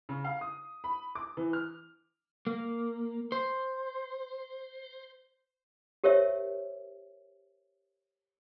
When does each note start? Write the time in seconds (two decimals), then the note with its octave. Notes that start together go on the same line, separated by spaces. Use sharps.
0.09 C#3
0.24 F5
0.41 D#6
0.84 B5
1.15 D6
1.37 E3
1.53 F6
2.47 A#3
3.32 C5
6.04 G4 A#4 C5 C#5 E5